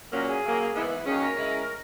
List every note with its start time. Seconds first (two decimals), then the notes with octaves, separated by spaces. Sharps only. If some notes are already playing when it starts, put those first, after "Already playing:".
0.12 A#2 F#3 A#3 C#4 A#4
0.27 G#4
0.43 C#3 F#3 A#3
0.73 G#2 E3 B3 E4
1.04 F#2 D#3 A#3 C#4 G#4
1.20 A#4
1.36 C#3 G#3 C#4 E4